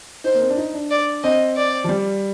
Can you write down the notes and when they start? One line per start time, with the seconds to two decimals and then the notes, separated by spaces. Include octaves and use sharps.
0.24 D#4 C5
0.35 A#3
0.42 C4
0.50 D4
0.57 D#4
0.74 D4
0.90 D5
1.23 C4 D#5
1.56 D5
1.84 F3
1.89 G3